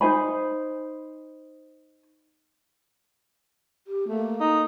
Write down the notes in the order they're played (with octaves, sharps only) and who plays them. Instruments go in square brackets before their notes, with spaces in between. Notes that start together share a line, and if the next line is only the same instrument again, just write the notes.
[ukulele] D#4 C5 G#5 B5
[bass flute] G4
[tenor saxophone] A3 [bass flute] A#3
[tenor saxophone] D#4